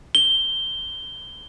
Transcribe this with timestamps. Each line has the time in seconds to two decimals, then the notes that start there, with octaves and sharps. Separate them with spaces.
0.15 G7